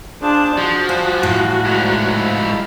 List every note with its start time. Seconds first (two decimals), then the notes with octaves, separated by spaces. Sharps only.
0.22 D4 F4 G#4 C5 A5
0.58 F3 F#4
0.89 G3 C5 F5 G#5
1.23 A2
1.65 G#2 F3
2.13 F5 B5 E6